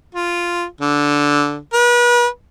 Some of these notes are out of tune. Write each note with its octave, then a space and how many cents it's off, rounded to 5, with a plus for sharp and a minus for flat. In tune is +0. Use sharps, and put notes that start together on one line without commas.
F4 -5
D3 -10
B4 -35